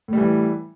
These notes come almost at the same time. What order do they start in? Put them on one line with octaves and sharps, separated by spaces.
A2 G3 E3